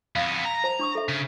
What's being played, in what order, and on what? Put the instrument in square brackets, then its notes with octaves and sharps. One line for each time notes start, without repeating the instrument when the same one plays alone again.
[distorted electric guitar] F2 B3 [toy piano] F5
[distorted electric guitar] A#5
[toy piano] C5 A5
D4 C#6 D#6
A4 E5
[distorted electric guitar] C#3